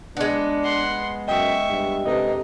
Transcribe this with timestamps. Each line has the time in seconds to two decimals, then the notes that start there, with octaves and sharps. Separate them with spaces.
0.17 G#3 B3 D4
0.64 F#5 C6
1.28 F#2 D#5 E5 G5 C#6
1.70 G2
2.06 C3 D4 D#4 A4 B4 D#5